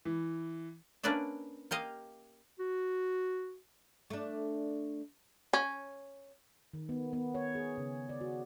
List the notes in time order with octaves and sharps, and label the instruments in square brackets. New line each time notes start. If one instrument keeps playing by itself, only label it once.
[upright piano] E3
[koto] A#3 C#4 D4 B4 D5 E5
A#3 G4 D#5 F5
[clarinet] F#4
[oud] A3 D4
[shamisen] C#4
[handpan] D#3
B3
B3
C#5
G#4
C#3
D5
F#4